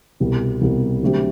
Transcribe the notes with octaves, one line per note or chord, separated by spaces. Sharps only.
C2 B2 G3
C2 B2 G3
D3 F#3 A3 C4 G4